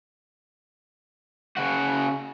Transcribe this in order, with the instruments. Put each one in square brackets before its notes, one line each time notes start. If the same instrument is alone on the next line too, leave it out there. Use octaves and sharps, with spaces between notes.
[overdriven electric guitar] C#3 F#4